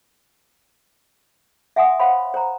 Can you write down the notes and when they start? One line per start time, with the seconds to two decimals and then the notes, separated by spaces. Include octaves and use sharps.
1.76 E5 F#5 G#5 C6 D#6
1.99 C5 C#5 F5 F#5 B5 C6
2.34 C5 A#5